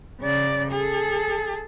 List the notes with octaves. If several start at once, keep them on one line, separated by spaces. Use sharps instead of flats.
C#3 D5
G#4 A4